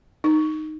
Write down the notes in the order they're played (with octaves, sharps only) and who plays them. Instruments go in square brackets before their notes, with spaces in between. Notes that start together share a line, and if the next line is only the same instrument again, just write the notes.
[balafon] D#4